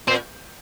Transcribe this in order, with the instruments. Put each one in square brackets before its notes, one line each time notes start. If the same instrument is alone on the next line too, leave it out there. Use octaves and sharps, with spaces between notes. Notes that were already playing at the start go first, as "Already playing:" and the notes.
[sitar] A#2 [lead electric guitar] C4